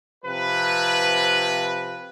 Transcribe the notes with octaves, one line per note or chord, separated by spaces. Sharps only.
C3 F3 B4